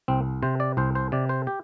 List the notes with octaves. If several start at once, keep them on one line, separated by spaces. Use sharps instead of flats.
C2 C4
C3 C5
D5
C2 C5
C5
C3 D5
C5
G4